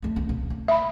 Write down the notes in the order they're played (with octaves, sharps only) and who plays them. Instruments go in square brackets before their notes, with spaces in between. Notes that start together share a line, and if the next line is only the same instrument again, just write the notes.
[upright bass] D2 A3
C#2 C#4
C3
D2
[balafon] E5 B5